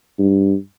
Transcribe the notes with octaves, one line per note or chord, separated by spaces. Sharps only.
G2